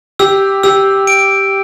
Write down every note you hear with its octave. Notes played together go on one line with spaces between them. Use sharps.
G4 E6
G4 E6
D7